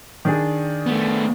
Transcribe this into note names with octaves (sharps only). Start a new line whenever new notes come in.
D#3 D4 G#4
A3 B3